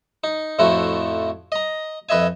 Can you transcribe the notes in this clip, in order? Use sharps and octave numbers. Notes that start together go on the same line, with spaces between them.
D#4
F2 A2 F3 A3 E4 F#4
D#5 A#5
F2 B4 D#5 E5 G#5